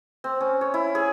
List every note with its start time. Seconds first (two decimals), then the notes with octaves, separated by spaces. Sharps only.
0.24 C4
0.41 C#4
0.61 C#5
0.74 E4
0.95 G#4